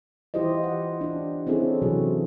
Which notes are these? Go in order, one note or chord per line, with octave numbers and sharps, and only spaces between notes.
E3 E4 F4 G4 C5 D#5
F#5
D4 G4
C4 C#4 E4 G#4 A4
C3 E3 F#3 F#4 G#4